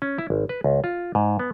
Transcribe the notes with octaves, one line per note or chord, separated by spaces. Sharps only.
C#4
E4
G#1
B4
C#2
F4
G#2
B3